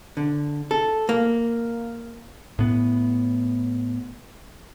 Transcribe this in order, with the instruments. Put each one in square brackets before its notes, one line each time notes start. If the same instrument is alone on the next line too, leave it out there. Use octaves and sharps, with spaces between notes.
[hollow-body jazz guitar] D3
A4
A#3
[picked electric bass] A2 B3